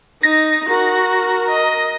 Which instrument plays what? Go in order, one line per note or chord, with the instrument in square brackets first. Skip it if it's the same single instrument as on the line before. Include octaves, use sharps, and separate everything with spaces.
[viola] D#4 [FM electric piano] A#6
[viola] F#4 [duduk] A#4
[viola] D#5